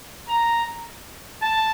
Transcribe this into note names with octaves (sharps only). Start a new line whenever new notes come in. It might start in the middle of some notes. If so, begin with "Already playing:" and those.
A#5
A5